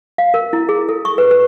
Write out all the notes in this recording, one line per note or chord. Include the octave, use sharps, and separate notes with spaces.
F5
A#4
E4
G#4
A4
C#6
B4
B4